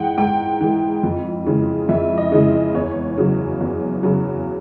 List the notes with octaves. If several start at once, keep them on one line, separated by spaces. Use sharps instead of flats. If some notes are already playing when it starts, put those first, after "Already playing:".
Already playing: G#2 E3 G#3 F#5 G5
G#2 G5
E3 G#3
F2
C#3 E3 G#3
F2 E5
D#5
C#3 E3 G#3
E2 C#5
C#3 F#3
E2
C#3 F#3